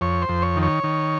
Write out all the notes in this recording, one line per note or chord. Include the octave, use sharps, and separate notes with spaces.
F2 C#5
C5
F2
C#5
D#3
C#5
D#3